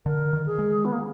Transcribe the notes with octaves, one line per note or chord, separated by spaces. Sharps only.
D3 A#4
D#3
G#4
G#3
B3
A#3